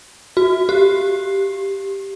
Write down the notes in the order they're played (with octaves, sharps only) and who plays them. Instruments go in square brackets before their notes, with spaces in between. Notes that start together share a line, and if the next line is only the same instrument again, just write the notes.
[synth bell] F#4
G4